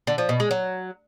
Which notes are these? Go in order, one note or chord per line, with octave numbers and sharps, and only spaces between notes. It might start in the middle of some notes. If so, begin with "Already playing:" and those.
D3
F3
B2
G#3
F#3